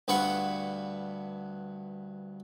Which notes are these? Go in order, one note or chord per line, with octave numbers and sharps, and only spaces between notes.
D2 G2 F4 B4 F#5 C#6